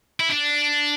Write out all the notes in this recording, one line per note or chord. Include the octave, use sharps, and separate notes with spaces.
E4
D4